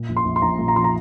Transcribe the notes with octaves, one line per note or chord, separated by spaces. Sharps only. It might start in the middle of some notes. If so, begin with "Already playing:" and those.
Already playing: A#2
A#1
C6
A#1
C6
A#1 A#5
A#2
A#5
F3 C6
A#5